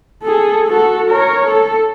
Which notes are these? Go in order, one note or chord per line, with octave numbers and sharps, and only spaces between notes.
G#4 A4
F#4 A4
A#4 C#5
A4